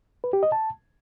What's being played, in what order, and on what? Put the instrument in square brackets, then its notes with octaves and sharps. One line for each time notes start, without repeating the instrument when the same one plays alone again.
[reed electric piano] B4
G4
D#5
A5